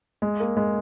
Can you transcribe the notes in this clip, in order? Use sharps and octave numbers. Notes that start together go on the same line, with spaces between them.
G#3
A#3
G#3